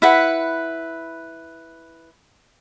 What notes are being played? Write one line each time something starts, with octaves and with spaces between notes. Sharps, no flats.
E4 B4 F#5